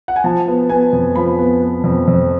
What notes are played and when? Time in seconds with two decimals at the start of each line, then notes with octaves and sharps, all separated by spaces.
0.08 F#5
0.16 G#5
0.24 F3 A5
0.48 B3
0.69 B3 G#5
0.93 F2
1.16 F3 B5
1.39 B3
1.62 B3
1.84 F2
2.08 F2